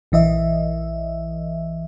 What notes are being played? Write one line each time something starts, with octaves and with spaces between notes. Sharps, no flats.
A#1 E3 D#5 E5